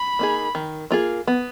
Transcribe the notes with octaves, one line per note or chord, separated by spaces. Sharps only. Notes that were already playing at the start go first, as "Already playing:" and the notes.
Already playing: B5
A#3 D#4 G#4
D#3
A#3 F4 G#4
B3